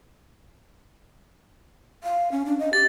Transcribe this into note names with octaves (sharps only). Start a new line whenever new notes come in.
F5
C#4
D4
D#5
G4 A6